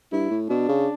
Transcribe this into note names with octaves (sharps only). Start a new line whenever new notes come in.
G2 E4
A2
B2 D4
C#3